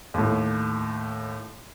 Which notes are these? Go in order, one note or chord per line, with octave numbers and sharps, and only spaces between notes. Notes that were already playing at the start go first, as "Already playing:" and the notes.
D#2 A2